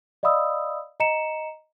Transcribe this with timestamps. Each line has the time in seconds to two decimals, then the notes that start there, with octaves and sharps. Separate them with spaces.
0.23 D5 D#5 F5 B5 D#6 E6
1.00 D#5 A#5 C#7 E7